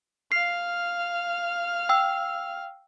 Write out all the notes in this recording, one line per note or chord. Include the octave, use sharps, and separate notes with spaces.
F5 F6 C7
G5 E6